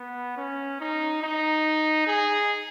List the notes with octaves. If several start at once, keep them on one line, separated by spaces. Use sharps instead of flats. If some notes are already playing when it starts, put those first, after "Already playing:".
Already playing: B3
C#4
D#4
D#4
G#4